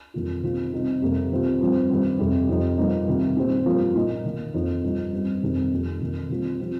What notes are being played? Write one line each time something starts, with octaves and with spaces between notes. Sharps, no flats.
F2 D#3 G3 A#3 F4
D#3 C4 F4
C3 G3 C4 D#4
F2 C3 G3 A#3
D#3 C4 F4
G2 F3 C4
G2 D#3 C4
F2 C3 G3
F2 F3 D#4
G2 F3 A#3 D#4
C3 D#3 G3 A#3
A#2 G3 C4
G2 F3 A#3 F4
A#2 A#3 D#4
D#3 A#3 D#4
F2 F3 D#4
G2 F3 D#4
G2 G3 C4 D#4
F2 D#3 G3 C4 D#4
F2 F3 A#3
F2 D#3 A#3
D#3 G3 C4 F4
F3 C4 F4